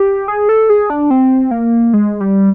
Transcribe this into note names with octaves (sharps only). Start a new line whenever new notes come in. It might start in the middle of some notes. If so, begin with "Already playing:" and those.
Already playing: G4
G#4
A4
G#4
D4
C4
A#3
G#3
G3